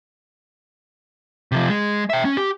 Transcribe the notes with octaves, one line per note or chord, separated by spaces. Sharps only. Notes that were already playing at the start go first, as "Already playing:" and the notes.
C3 F3
G#3
E5 G5
C#4
G4